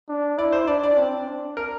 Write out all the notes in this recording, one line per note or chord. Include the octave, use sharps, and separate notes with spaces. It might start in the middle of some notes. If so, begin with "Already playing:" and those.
D4
E4 D5
C5
D4 D5
D5
C4
D4
A#4